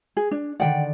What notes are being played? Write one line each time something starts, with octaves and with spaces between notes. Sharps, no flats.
G#4
D4
D3 D#3 D5 F#5 G5